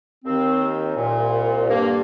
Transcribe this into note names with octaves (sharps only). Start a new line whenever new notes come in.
D#2 D#3 C4
C2 A#2
G2 D3 A#3